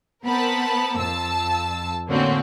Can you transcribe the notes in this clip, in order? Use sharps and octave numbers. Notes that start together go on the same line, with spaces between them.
B3 C4 A#4 A5 B5
F2 A5 E6
A2 D3 A#3 C4 C#4 F#4